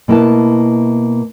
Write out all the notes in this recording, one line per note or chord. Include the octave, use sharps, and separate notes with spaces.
B2 A#3 C4 E4 B4 A5